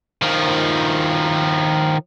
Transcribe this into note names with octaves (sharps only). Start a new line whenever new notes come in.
D#3 F3